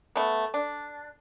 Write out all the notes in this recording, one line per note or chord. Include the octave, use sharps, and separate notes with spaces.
A3 B3
D4